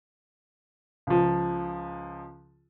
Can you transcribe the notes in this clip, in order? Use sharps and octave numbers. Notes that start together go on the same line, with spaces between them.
C#2 F3